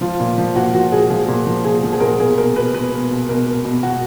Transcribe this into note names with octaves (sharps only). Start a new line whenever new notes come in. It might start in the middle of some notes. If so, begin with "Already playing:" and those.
F3 F4
A#2
F3
A#2 F#4
F3 F#4
A#2 G#4
F3 G#4
A#2
F3
A#2 G#4
F3
G#4
A#2 A#4
G#4
B2 G#4
B2 A#4
B2 B4
B2 B4
B2
B2
B2 A#4
B2
B2
B2 F#4